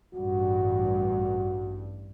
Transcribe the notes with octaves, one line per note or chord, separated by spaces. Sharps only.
A1 G2 F#4